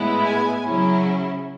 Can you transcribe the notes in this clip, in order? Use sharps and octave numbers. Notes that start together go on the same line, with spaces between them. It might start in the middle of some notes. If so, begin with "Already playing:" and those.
Already playing: A2 G#3 B3 E4
G#5
C#3 F#3 C#4 E4